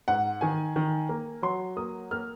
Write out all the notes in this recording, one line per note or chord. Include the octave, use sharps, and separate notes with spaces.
G#2 F#5
D#3 G#5
D#3
A#3
F#3 C6
A#3 D#6
A#3 F6